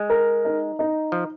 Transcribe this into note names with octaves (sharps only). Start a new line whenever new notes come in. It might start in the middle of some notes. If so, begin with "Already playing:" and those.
Already playing: G#3
A#4
D#4
D#4
F3